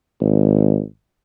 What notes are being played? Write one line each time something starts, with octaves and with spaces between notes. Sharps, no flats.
G#1